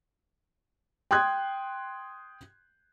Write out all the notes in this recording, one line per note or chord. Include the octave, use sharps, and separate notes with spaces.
G5 C6 D#6 F#6 G#6